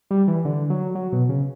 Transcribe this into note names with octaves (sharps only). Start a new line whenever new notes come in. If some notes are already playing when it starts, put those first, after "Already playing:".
G3
E3
D3
F#3
F#3
B2
C#3